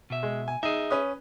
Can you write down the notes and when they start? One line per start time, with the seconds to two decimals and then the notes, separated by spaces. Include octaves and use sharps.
0.10 B2 E5
0.23 G#3
0.48 G#5
0.63 D#4 G#4 E5
0.90 C#4 B4 D#6